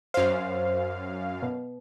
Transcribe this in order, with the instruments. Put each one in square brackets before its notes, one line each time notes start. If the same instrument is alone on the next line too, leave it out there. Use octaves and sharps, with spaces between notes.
[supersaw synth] F#2 F5 [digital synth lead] C5
[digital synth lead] B2